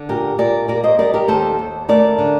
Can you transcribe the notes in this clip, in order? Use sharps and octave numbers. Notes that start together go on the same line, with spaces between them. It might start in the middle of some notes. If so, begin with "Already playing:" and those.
Already playing: D3
A#2 G4 A#4
A#2 A#4 D5
A#3 A#4 D5
C5 D#5
G3 A#4 D5
G4 A#4
D#2 A4 C5
D#2
A3 A#4 D5
D3